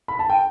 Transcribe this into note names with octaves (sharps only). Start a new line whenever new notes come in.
B5
A5
G5